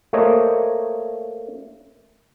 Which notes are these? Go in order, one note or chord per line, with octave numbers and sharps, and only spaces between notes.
A3 A#3 C5 C#5 D#5